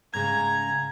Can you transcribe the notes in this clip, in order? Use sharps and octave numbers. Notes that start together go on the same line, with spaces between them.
G#2 C#3 A#5 G#6